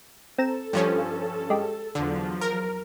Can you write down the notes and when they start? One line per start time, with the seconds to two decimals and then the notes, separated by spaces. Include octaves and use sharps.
0.38 C4 A4 A#5 E7
0.73 G2 F3 C#4
1.50 G#3 G4
1.95 E2 D3 F3 F#3
2.41 A#4